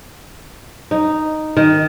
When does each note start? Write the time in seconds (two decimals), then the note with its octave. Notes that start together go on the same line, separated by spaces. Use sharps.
0.91 D#4
1.57 D#3